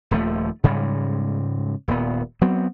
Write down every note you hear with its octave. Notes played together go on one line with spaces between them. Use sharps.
D#1 D#2 F3 A3
G#2 C#3 G3 G#3
D#1 A#2 B3
F#3 B3 C4